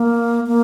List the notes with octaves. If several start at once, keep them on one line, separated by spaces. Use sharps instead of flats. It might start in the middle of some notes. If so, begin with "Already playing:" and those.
Already playing: A#3
A#3